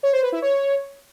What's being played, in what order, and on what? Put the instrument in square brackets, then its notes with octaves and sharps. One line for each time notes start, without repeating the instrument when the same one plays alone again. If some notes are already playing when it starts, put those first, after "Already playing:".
[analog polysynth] C#5
C5
B4
E4
C#5